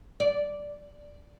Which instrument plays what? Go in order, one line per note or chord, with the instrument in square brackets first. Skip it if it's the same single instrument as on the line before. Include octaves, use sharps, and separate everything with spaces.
[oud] D5